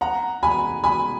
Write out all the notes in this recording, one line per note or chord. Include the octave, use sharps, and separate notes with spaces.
F#5 A#5
G#5 B5
G#5 B5